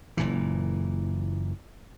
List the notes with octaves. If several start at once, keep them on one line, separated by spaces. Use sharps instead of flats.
F#1 A#2 E3